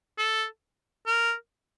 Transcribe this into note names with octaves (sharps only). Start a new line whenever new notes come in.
A4
A#4